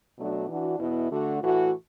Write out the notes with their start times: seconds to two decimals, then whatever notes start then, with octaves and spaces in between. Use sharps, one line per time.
0.17 B2 F#3 A3 D4 F#4
0.49 E3 D4 F#4
0.79 E2 B2 B3 E4
1.10 D3 A3 F#4
1.41 A2 E3 A3 F#4